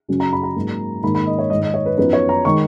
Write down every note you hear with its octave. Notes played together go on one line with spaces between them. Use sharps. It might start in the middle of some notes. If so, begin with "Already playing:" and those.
F#2 C#3 F#3 C#4
A#5
B5
A#5
G#2 F#3 A#3
G#2 D#3 A#3 D#4 B5
B5
D#5
C#5
G#2 D#3 G#3 D#5
D#5
C#5
B4
F#2 F3 B3 D#4 B4
C#5
A#5
D#3 G#3 D#4 C#6